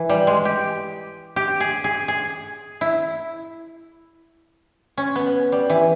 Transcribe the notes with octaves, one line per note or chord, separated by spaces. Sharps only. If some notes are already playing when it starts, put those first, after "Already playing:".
Already playing: E3
G3
G#3
G4
G4
G#4
G#4
G#4
E4
C#4
B3
G3
E3